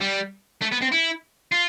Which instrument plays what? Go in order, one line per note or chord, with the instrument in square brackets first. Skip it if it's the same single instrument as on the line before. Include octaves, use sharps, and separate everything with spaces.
[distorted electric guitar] G3
A3
B3
C4
E4
F4